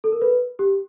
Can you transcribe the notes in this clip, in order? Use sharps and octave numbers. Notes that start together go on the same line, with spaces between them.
A4
A#4
B4
G4